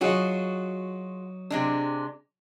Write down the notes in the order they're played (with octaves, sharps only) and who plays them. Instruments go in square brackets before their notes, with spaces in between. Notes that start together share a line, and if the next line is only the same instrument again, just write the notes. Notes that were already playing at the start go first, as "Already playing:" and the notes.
[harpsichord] F#3 D#4 [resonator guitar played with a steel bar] F4 F#4 G#4
[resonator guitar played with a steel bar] C3 G#3 D4